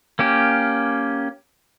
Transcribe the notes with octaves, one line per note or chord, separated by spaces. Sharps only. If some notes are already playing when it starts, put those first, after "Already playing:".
A#3 C#4 G4